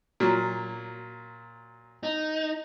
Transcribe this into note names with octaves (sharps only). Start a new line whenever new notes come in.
A#2 F#3
D#4